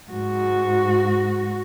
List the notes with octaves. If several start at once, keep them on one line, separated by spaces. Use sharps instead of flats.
G#2 F#4